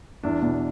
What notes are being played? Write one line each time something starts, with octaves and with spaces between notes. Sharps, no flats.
E2 D4
B2